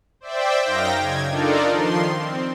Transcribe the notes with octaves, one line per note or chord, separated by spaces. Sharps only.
C5 D5 E5 G5
F#2 D#4 F5 G5 A#6
C#3 G#6
D4 D#4 F4 A4 A#4 D5
D#3 F3 C6
C4